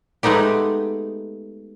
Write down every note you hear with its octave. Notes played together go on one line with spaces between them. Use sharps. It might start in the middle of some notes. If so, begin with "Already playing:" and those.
G#3 A3 B3 D#4 G4